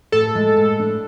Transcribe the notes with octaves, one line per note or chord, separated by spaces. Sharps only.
A2 A4
G#3
A2
D4